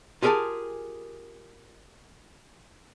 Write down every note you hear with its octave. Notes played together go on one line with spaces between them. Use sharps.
F4 G4 G#4 A#4 G#5 A5